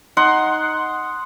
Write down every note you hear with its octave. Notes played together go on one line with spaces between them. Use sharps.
D#4 F#5 C6